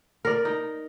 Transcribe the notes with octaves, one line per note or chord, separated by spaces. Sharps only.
A#4 D5
D#4